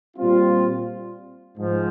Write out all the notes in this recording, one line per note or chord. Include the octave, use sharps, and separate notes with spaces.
A#2 G3 C4 F4
G#2 F3